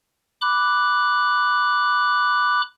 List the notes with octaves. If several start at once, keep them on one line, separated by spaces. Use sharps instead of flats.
B5 D6 F#6